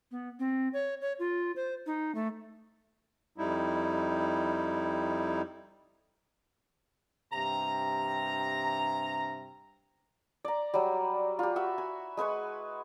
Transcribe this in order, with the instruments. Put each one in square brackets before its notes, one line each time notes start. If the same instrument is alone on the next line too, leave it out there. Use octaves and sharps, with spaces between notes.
[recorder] B3
C4
C#5
C#5
F4
C5
D#4
A3
[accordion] F2 G3 D#4 E4
[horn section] G2 C3 A#5
[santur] D5 A#5
F#3 G3
F4 G4
F#4 E5 B5
G#5
G#3 B4 G#5 C#6